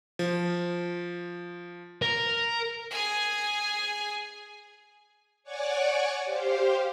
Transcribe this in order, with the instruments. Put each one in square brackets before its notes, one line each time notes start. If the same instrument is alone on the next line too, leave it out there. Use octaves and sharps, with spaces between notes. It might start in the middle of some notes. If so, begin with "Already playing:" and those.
[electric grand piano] F3
[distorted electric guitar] A#4
[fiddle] G#4 G#5
[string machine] C#5 D5 F#5 G#5 C#6 D6
G4 C5 F5